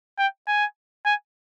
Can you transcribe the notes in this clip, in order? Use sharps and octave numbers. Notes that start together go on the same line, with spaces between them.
G5
G#5
G#5